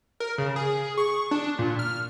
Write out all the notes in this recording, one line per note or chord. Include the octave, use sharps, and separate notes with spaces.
A#4
C#3
G#4
C#6
D4
A#2
F6